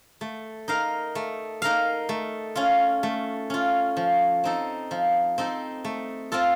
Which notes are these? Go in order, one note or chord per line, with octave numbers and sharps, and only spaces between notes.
A3
D#4 A#4 F5
A3
D#4 A#4 F5
A3
C#4 F4
A3
C#4 F4
F3
C4 D#4 A4
F3
C4 D#4 A4
A3
C4 F4 A4